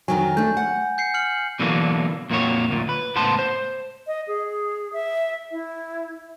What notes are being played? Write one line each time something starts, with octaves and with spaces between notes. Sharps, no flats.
F2 D#3 F#3 G#5
A3 D4 G6
F#5
G6 C7 C#7
F6 C#7 F#7
B2 D3 E3 F#3 A#3 D4
F2 A#2 A#3 D4 F#4 C#5
D2 A#2
B4
C#2 A2 B3 C5 A5 C6
C5
D#5
G#4
E5
E4